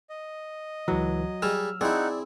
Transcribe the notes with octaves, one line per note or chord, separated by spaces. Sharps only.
D#5
C#2 E3 F#3
G3 G#4 E6 F6
C4 D#4 E4 G#4 D5 F#5